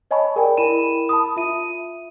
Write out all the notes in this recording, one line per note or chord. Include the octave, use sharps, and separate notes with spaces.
C#5 D#5 G#5 A5 B5 C#6
G#4 A#4 D5 G5 G#5
E4 A#4 B5 D#7 E7
A5 B5 D#6
F4 E5 D#7